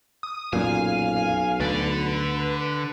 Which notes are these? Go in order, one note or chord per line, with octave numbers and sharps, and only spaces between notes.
D#6
B1 F#2 A#2 F5 G#5
D2 D3 B4 D5